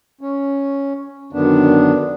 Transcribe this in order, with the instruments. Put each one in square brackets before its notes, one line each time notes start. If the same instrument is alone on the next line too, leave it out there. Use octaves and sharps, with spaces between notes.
[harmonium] C#4
F#2 D3 D#3 B3 D4